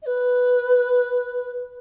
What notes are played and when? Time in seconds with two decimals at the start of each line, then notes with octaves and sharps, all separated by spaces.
0.02 D#5
0.06 B4